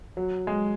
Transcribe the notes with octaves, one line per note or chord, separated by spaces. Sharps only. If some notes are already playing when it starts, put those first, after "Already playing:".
F#3
G#3